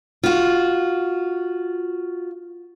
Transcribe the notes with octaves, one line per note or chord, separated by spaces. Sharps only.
F4 F#4